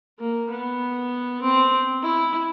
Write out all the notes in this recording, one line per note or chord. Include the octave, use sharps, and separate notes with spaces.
A#3
B3
C4
E4